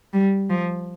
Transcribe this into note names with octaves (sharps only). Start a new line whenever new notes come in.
G3
F3